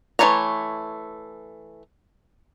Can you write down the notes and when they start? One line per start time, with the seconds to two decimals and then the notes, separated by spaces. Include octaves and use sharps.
0.19 E3 G#3 A3 C#5 A#5